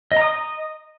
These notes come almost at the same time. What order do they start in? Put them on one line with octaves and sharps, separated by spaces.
D#5 A#5 D#6